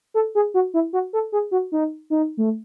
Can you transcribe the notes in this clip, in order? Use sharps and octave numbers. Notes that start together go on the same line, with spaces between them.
A4
G#4
F#4
E4
F#4
A4
G#4
F#4
D#4
D#4
A3